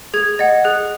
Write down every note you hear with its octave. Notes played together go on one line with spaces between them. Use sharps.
G#4 G#6
D#5 F#5 A6
G#4 F#6